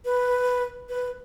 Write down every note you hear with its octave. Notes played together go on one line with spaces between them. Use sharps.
B4
B4